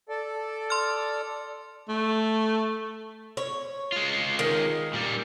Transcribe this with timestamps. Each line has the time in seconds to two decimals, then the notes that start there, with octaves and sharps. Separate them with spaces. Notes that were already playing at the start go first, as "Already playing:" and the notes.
0.09 A4 D5
0.70 C6 F6
1.89 A3
3.37 C#5
3.92 G#3 F4
4.39 D#3
4.93 A#2 G3